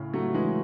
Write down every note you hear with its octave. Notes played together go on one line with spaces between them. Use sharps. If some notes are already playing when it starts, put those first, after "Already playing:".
Already playing: A2 C#3
F#3 A3
E3 G#3